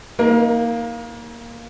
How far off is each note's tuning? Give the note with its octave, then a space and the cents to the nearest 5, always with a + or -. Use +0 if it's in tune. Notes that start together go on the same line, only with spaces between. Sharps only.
A#3 +0 D#4 +20 A#4 +35